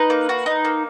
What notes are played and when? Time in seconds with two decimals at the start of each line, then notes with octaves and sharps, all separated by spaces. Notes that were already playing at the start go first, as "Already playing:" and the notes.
Already playing: D#4 B4
0.10 A#3
0.29 F#4
0.46 D#4
0.65 A#3